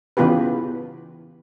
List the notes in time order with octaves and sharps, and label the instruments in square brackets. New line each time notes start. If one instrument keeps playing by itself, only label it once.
[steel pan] C#3 E3 B3 F4 G4 B4